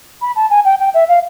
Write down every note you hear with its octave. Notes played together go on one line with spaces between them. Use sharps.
B5
A5
G#5
G5
G5
E5
F5